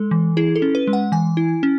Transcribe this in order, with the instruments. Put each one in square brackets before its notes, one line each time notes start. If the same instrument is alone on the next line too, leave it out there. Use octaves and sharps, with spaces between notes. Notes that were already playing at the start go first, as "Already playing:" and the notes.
Already playing: [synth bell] G#3 A4
E3
E4 G#4
A4
C#4
B4
G#3
F#5
E3 G#5
E4
C#4